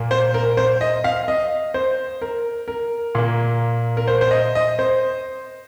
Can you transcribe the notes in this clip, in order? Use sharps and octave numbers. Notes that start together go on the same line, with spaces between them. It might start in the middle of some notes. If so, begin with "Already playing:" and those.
Already playing: A#2 A#3
C5
A#4
C5
D#5
F5
D#5
C5
A#4
A#4
A#2 A#3
A#4
C5
C5
D#5
D#5
C5